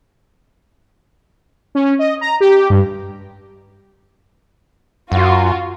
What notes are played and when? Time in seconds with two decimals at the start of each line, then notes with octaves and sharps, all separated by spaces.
1.75 C#4
1.99 D#5
2.21 A#5
2.40 G4
2.70 G2
5.12 F#2 F4 F#4